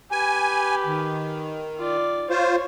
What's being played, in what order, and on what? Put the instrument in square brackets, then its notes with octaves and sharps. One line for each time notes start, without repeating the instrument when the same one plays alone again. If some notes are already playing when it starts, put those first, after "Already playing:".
[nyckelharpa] G4 B4 [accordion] G#5
[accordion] D#3
[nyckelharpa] F4 D5
[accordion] F4 C5 [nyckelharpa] C#5